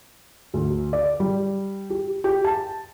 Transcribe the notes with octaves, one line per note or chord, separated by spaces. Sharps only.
D2
D5
G3
G4
G4
A5